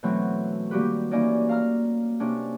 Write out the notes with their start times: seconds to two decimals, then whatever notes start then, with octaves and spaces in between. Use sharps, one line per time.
0.03 B2 E3 F#3 A3 C4
0.71 D#3 G3 A#3 F#4 G4 B4
1.11 E3 A#3 C#4 D#4 D5 D#5
1.49 F5 A#5 F6
2.20 C3 A#3 C#4 D4